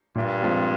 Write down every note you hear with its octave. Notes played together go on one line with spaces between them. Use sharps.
G2 A#2
F3 G#3 C4 F4